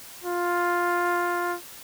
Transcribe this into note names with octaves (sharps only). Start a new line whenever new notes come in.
F4